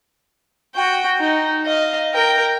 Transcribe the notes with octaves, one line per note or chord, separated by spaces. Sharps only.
F#4 G5
D#4
D#5 F5
A#4 G5